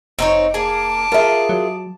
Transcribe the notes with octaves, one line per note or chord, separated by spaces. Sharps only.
F1 C4 D#4 C#5
A#3 G#4 A5 D6
F4 G#4 A#4 E5
F#3